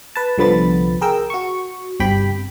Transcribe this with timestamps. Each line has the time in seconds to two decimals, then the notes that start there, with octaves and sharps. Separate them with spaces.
0.16 B4 A5
0.38 C2 D3 F3 B3 B5 A6
1.01 G#4 A#4 G5 E6
1.30 F#4 C#6
2.00 G1 C3 G4 G5 B5